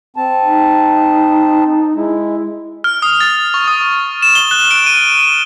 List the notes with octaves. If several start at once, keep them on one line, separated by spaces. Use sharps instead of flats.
C4 A5
D#4
G#3 E4
F6
D#6
A6
C#6
D#6
E7
G7
F#6
D7
D#7
G7